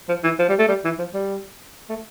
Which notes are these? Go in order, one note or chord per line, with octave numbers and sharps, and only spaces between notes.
F3
E3
F3
G3
A3
G3
E3
F3
G3
A3